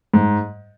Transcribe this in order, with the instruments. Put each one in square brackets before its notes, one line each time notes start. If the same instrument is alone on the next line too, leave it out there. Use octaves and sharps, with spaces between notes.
[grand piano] G#2